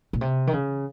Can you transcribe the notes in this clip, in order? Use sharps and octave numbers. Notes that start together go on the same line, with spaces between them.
A#2
C3
D#3
C#3